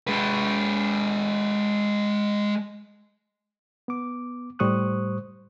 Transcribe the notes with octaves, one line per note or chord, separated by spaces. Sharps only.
G#3 B4
B3 D6
A2 G3 C5 C#6 D#6 F#6